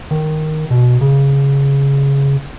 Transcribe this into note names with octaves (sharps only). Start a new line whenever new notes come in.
D#3
B2
C#3